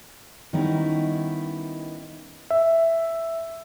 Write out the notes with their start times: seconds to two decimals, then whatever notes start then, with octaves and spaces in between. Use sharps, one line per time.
0.53 D#3 G3 B3 C#4 D#4 E4
2.50 E5